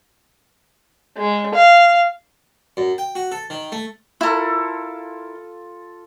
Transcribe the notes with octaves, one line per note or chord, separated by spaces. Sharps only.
G#3
F5
F#2
G5
F#4
A4
D#3
A3
E4 F4 A4 A#4